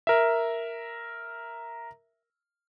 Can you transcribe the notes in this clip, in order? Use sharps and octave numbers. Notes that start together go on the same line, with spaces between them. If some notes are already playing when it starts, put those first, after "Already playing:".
A#4 E5